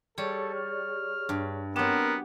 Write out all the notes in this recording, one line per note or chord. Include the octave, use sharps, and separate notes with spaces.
G3 G#4 A4 C#5 C#6
F6
G2
F#3 B3 C4 G4 A#4